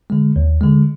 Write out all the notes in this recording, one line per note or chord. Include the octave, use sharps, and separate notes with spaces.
D3 G#3
D#2
D3 G#3